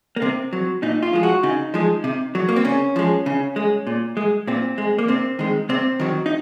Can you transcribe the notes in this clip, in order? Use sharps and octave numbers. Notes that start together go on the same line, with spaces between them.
A#3
C3 C4
F#3
A#2 D#4
F4
F3 G#3
F#4
C#3 D#4
F3 G#3
C3
F#3
A#3
C4
C#3 C#4
F3 G#3
C#3
G#3
A#2
G#3
A#2 C4
G#3
A#3
C3 C4
D#3 G#3
C3 C4
D#3 F#3
D#4